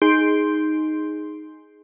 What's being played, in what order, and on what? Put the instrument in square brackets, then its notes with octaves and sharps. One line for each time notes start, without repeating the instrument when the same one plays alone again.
[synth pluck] D#4 G#4 C6 G6 D7